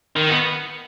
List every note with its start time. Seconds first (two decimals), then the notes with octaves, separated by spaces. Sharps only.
0.16 D#3
0.30 B3